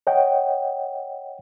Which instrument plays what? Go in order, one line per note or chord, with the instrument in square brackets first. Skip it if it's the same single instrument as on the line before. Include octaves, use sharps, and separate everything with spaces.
[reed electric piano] C#5 D#5 F#5 G5